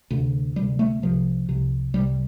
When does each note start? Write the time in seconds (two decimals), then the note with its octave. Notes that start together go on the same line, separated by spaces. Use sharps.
0.11 D2 C3
0.56 D2 C3 G3
0.79 A3
1.02 C2 C3 F3
1.49 C2 C3
1.94 C2 C3 G3